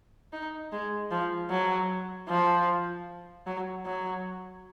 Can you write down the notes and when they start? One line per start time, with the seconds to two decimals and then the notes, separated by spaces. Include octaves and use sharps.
0.33 D#4
0.72 G#3
1.11 F3
1.50 F#3
2.28 F3
3.47 F#3
3.85 F#3